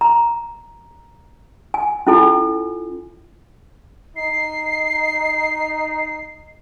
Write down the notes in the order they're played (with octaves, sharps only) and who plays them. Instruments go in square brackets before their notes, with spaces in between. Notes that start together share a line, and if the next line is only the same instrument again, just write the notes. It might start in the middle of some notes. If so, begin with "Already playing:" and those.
[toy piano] A#5
G#5
C#4 E4 F4 A4 G#5
[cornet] D#4 [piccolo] C7